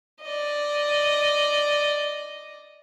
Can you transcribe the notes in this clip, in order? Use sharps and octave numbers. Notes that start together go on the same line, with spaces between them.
D5 D#5